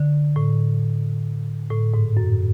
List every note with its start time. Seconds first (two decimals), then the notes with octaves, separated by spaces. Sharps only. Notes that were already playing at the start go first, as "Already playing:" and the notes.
Already playing: D3
0.36 A2
1.71 A2
1.94 G#2
2.17 F#2